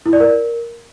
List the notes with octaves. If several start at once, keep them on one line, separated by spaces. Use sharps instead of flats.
E4
D5
A#4